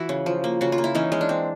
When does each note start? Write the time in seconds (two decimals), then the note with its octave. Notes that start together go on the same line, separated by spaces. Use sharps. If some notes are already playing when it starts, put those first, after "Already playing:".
Already playing: E3 E4 F#4
0.09 C#3
0.26 F3
0.44 A#3
0.61 C#3 F#4
0.72 F4
0.78 A#3
0.84 E4
0.95 E3 C#4 D#4
1.12 G#3 C#4
1.21 D4
1.29 C4